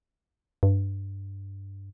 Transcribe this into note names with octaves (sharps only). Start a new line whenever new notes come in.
G2